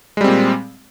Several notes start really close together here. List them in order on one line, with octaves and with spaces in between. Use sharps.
G#3 G3 C4 A#2